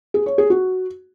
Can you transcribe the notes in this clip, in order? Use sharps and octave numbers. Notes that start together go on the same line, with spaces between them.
G#4
C#5
G#4
F#4